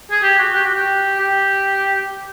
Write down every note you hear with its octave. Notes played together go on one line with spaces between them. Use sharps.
G#4
G4
F#4
G4
F#4
G4
G4